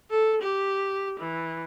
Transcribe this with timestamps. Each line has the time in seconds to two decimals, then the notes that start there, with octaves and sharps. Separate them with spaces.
0.11 A4
0.43 G4
1.19 E3